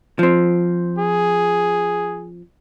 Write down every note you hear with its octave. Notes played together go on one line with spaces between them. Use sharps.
F3 C4
G#4